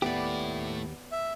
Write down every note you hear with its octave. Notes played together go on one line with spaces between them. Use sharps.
D#2 A3 B3 E4 G4 D5
E5